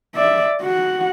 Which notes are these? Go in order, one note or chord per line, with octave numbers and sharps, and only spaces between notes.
D5 E5
F#4 F#5